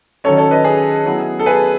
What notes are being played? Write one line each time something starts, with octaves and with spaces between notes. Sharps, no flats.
D#3 F#3 C#4 A4 C#5
A4 C#5
B4 D#5
G#4
F#3 B3 E4
A4
G#4 B4